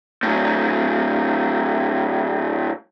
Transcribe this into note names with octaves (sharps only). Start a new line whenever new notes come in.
A2 F#3